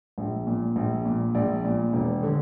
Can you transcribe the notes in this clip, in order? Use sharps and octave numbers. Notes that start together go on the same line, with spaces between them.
A#1
A#2
A#1
A#2
A#1 D5
A#2
E1
D3